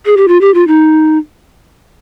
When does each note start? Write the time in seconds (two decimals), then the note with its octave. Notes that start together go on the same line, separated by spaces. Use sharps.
0.06 G#4
0.17 G4
0.28 F4
0.41 G4
0.54 F4
0.67 D#4